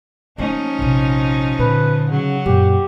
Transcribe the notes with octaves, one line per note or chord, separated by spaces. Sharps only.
F3 A3 A#3 C#4 D#4
A#1 C3
A#2 D3 B4
C#3 F#3
F#2 A#2 G4